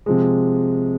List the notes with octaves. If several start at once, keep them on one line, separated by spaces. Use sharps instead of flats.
C3 F3 G#3